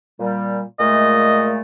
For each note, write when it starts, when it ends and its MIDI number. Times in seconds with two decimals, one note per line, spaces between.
0.20 0.61 46
0.20 0.61 55
0.79 1.61 46
0.79 1.61 56
0.79 1.61 57
0.79 1.56 75